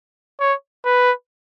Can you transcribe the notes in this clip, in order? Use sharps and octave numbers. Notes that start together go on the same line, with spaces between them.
C#5
B4